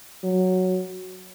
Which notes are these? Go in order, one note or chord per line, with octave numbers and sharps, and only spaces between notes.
F#3